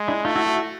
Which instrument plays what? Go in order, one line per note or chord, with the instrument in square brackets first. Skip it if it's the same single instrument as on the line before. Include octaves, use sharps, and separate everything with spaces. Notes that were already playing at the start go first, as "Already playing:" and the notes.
Already playing: [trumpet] G#3
[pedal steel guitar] D4 E4
[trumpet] A3 [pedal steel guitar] D#4 F4
[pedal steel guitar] E4 F#4
E4 F#4